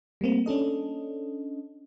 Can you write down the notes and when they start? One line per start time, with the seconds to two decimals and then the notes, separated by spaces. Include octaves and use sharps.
0.21 G3 A3 A#3 C4
0.46 C#4 D4 A4 D#5